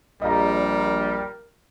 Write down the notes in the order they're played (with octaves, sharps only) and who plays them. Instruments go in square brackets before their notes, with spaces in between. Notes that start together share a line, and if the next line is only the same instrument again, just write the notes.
[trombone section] A#1 [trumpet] G3 [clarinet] A#4 [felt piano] D#5 F5 A#5